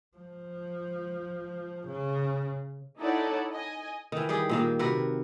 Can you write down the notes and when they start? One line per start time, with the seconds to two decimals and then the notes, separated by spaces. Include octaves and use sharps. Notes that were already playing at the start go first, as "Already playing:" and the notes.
0.17 F3
1.87 C#3
2.99 D#4 E4 A4 C#5 D5 F#5
3.53 D#5 G#5
4.12 D#3 E3
4.29 G3 G4 G#4
4.49 A#2 D#3 A#3
4.79 C3 F#4 A#4 B4